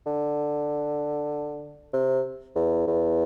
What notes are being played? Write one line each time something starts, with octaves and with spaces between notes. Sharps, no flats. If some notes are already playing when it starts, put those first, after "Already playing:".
D3
C3
E2
E2